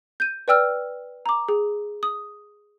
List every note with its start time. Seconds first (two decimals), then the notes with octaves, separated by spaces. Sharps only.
0.20 G6 D#7
0.48 B4 D5 G5 E6 F6
1.26 A#5 D6
1.49 G#4
2.03 D#6